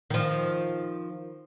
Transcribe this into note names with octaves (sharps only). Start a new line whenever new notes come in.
D#3 F3